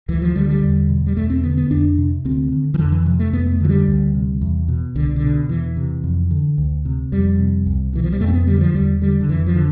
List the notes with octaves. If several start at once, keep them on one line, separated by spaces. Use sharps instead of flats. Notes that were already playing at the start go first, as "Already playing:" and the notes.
D2 E3
F3
D3 G3
G3
E2
B2
G3
E2 A3
C4
D3 B3
B3
F2 D4
C3
D2 C4
D3
E3
F2 D3
E3
C3 F3
A3
F2 B3
A3
D3 F3
G3
D2
C3
E2
B2
C2 D3
D3
B2
E2 E3
C3
F2
D3
D2
C3
F2 G3
C3
C2
B2 E3
F3
G3
F2 A3
C4
B3
D3 G3
F3
E2 G3
D3 G3
D3
F2 E3
F3
D3